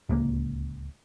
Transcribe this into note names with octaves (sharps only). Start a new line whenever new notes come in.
D1 C#2 A#3